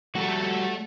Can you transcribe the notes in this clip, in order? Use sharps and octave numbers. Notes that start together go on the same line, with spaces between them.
G3 A3 F#4 A4